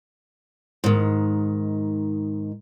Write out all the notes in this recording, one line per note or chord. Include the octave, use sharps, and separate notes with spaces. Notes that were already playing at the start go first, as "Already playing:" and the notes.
G#2 D#3